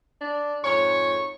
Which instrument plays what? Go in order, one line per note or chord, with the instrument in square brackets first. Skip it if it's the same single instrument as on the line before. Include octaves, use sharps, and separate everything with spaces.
[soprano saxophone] D4
[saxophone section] F2 G#2 C#5 [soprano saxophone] C#6